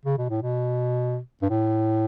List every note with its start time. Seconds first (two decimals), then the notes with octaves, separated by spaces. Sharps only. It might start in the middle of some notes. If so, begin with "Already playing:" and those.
0.05 C#3
0.18 B2
0.30 A2
0.42 B2
1.42 G2
1.50 A2